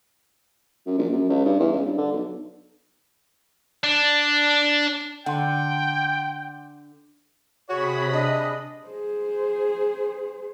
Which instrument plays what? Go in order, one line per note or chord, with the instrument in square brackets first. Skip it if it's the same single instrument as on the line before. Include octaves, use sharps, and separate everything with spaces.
[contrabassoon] F#2
A#1
F#2
C#2
G2
E2
C#2
G2
D3
B1
[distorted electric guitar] D4
[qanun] D3 [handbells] F#5 C6 [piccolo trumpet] G5
[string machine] C3 B5 D#6 [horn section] F#4 G#4 C#5
[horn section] D4 G#4 D#5
[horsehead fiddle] G#4 C5